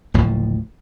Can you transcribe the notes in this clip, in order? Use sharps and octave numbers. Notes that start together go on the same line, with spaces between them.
F#1 D2 A2 F3